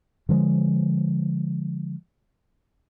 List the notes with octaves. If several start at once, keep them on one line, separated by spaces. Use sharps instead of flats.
D3 F3 G#3